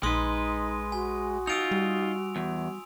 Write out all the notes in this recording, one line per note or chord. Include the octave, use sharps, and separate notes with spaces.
A#1 G#3 D#4 B4 C6 D#6
F#4 G#5
D#4 F4 E6 D7 F7
G3
E2